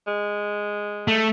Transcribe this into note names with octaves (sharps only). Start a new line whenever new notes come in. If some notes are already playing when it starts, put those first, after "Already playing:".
G#3
A3